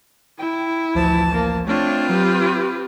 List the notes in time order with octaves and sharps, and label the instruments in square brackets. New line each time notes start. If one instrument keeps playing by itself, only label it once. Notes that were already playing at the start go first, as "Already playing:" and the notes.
[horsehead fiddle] E4 [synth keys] G5
[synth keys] A1 D2 F3 [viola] E3 A5
[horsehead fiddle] A#3
[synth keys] A3 [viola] C4 F4 [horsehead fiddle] D4 C#5
[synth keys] F#3 [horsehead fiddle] G4 B4